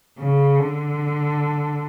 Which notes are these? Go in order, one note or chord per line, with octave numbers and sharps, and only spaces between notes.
C#3
D3